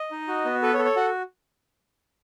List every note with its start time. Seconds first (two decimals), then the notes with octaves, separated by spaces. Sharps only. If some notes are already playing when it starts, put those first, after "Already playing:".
Already playing: D#5
0.11 D#4
0.28 F#4
0.45 B3
0.62 A4 B4
0.74 C#5
0.79 A4
0.85 C#5
0.96 F#4 F#5